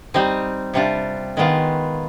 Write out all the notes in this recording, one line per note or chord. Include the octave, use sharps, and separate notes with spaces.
G3 C4 D#4
C3 G3 D4 F4
D#3 G#3 B3 F4